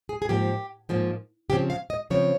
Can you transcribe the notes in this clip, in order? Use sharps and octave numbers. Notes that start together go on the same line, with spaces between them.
G#4
G#4
G#2 F3 A#3 G4
G#2 F3 A#3
C#3 F3 C4 G4
F5
D#5
C#3 F3 C4 C#5